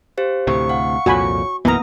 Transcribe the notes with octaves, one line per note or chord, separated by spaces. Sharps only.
G4 C5 F5
D2 A2 C3 C#6
F5 F#5
C2 F2 A#2 E4 F#4 C#5 G#5 B5
B1 F#2 E3 A#3 B3 A#4 A#5 D#6